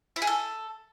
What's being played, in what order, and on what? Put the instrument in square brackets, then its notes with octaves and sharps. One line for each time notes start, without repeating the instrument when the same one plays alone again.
[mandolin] E4
G#4
A4